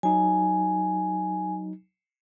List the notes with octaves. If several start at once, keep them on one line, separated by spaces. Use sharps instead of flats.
F#3 D#4 G#5